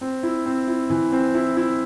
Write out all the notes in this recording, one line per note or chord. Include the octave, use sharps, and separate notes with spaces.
C4
E4
C4
E4
E3
C4
E4
E4